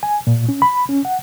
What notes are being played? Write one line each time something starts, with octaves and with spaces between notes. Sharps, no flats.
G#5
A#2
C#4
B5
C#4
F#5